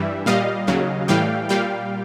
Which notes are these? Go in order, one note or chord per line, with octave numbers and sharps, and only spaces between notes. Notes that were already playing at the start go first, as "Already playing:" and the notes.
Already playing: G2 E3 G3 E5
A#2 G3 D#5 F5
D#2 C#3 F#3
A2 E3 G3 F5 G5
A#2 G3 F5 G5